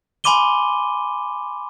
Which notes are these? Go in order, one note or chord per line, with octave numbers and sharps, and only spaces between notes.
G#5 B5 C6 D6 D#7 G7